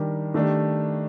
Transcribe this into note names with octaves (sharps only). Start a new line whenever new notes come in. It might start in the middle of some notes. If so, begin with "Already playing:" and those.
Already playing: D#3 G3 D4 G4 A#4
D#3 A3 D4 G4